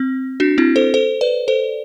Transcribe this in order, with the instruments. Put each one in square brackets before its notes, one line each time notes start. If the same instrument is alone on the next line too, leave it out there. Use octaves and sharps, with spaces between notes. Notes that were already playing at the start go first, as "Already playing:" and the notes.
Already playing: [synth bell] C4
D4 F#4
C4 E4
A4 C5
A4 C5
B4 D5
A4 C5